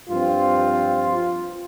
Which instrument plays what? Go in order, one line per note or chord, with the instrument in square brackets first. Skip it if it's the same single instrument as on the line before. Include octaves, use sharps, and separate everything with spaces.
[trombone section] G2 F3 C4 F4